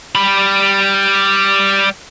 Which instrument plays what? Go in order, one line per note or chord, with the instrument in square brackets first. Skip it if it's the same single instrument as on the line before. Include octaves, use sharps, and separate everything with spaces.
[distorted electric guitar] G3 B5